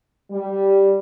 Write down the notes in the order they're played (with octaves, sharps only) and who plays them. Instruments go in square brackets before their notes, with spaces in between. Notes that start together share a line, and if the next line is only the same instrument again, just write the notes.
[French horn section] G3